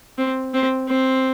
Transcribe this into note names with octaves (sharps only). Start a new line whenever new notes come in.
C4
C4
C4